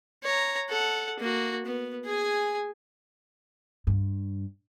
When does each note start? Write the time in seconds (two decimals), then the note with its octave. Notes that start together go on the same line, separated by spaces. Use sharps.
0.24 C#5 A#5
0.69 A4 F#5
1.20 A#3 F#4
1.66 B3
2.05 G#4 G#5
3.87 G2